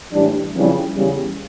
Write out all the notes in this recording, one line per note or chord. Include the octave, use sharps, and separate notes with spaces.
A2 E3 G3 D4
F2 C#3 E3 G3
E2 C#3 G3